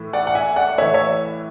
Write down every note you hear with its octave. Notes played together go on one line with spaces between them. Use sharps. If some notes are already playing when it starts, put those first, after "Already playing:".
Already playing: A2 E3
D5 F#5
F#5
E5 G#5
D5 F#5
A2 E3 C#5 E5
C#5 E5